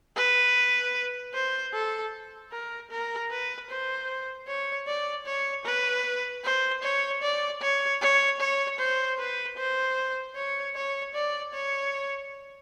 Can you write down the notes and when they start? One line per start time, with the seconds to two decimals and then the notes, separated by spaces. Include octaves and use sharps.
0.16 B4
1.34 C5
1.73 A4
2.52 A#4
2.91 A#4
3.31 B4
3.70 C5
4.48 C#5
4.87 D5
5.26 C#5
5.65 B4
6.44 C5
6.83 C#5
7.23 D5
7.62 C#5
8.01 C#5
8.41 C#5
8.79 C5
9.19 B4
9.57 C5
10.36 C#5
10.75 C#5
11.14 D5
11.54 C#5